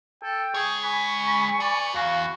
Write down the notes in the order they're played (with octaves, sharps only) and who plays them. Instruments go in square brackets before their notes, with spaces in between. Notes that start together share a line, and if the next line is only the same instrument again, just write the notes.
[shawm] A4 [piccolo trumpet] G5
[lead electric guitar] G#3 C#5 [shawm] G#4 [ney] C#6
[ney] G#5 [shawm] B5 [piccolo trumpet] C#6
[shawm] B5
[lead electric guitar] G#4 B4 [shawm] D5
[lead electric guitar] E2 [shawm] F#4 [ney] F5